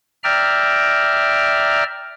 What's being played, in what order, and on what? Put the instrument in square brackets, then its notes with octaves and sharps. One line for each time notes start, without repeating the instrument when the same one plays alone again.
[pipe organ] D5 E5 G5 A#5 F6